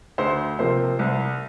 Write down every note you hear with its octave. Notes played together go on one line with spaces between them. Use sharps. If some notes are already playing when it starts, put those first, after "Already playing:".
D2 C5
C3 F3 A#3 C5
C2